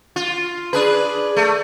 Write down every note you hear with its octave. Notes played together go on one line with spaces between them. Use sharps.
F4
D4 G#4 B4
A3